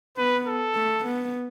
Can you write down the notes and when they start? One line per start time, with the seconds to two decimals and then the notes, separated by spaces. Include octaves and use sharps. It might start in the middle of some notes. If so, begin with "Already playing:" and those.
0.17 B3 B4
0.46 A4
0.75 A3
1.05 B3